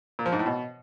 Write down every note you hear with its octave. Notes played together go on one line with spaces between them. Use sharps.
A#2
F3
G#2
A2
B2